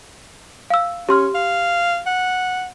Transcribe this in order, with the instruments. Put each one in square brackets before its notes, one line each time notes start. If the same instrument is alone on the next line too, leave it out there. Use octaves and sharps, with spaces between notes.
[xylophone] F5 E6
[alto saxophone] C#4 [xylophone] G4 C6 F6
[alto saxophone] F5
F#5